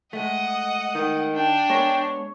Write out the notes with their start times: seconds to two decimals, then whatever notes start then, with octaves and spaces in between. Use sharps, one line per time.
0.13 G#3 A3 D#5 F#5
0.47 D#6
0.95 D#3
1.35 D4 G5
1.70 G#3 B3 A#4 C#5